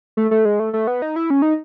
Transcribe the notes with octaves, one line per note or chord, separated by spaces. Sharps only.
A3
A3
G#3
A3
A3
B3
D#4
E4
C#4
D#4